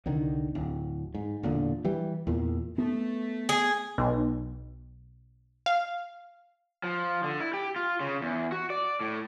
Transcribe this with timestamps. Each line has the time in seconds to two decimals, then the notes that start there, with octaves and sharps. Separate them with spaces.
0.06 C2 D3 D#3
0.55 D1
1.14 G#2
1.43 E1 A#2 D3
1.85 E3 G3
2.27 E2 A#2
2.78 A3 B3
3.49 G#4
3.98 B1
5.66 F5
6.83 F3
7.24 D3
7.41 E4
7.54 G4
7.76 F4
8.00 C#3
8.22 E2
8.52 F#4
8.70 D5
9.01 A2